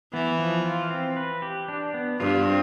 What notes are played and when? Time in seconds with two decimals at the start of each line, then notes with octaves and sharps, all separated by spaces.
0.13 E3 B3
0.39 F3
0.65 F4
0.91 C4
1.16 B4
1.42 G4
1.68 D4
1.94 B3
2.20 G2 F4
2.45 C4